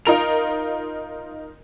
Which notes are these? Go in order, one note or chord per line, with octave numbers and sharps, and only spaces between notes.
D#4 F4 A#4 F7